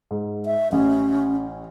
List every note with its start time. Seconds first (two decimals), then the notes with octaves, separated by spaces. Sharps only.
0.11 G#2
0.46 E5
0.72 A1 C#4